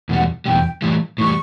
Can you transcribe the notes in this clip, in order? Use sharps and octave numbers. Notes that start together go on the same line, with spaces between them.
E2 B2 G3 F#5
E2 B2 G3 G5
A2 E3 G3
A2 E3 G3 C#6